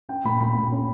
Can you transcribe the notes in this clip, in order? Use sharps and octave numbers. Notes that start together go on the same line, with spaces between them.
C#4 G5
A#2 B5
A#2 B5
A#2
C#4